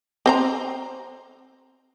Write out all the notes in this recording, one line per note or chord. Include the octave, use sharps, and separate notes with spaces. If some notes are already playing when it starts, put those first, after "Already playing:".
C4 C5 A#5